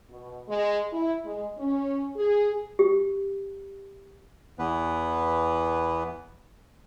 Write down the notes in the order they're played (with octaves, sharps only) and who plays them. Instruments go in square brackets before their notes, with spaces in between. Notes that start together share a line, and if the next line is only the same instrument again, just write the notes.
[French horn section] B2
G#3
E4
G#3
C#4
G#4
[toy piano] G4
[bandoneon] E2 E3 B3 B4